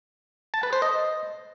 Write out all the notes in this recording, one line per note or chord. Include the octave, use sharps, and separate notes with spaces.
A5
B4
C5
D#5